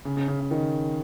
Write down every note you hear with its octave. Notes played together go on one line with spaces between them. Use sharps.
C#3
C#3
C#3
C#3
D#3